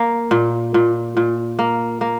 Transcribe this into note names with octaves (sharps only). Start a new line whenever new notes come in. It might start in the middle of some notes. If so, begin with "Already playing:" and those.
Already playing: A#3
A#2
A#2
A#2
A#3
A#3